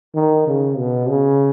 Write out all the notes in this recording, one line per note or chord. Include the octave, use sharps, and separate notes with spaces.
D#3
C#3
B2
C#3